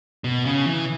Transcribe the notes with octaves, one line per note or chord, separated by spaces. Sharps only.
B2
C#3
E3